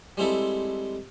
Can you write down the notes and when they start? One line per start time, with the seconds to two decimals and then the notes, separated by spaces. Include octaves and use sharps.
0.17 G3 G#3 C4 E4 A4